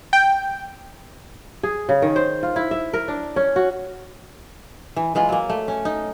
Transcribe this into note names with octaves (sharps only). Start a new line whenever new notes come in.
G5
G#4
C#3
D#3
C5
F4
E4
E5
A#4
D4
C#4
F#4
E3
E3 G#3 F4
F#3 A#3
A3
C#4
D#4